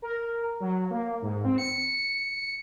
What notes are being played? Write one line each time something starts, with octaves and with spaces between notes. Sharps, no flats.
A#4
F#3
A#3
G#2
C4
C#7